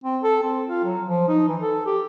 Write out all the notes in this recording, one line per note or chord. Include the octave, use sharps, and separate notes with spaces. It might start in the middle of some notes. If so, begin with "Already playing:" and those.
C4
A4
C4
F4
F#3
F3
D#4
E3
A4
G4